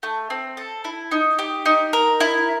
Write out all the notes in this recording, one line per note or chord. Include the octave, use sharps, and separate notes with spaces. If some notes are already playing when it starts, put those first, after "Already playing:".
A3
C4
A4
E4
D#4
G4
D#4
A#4
E4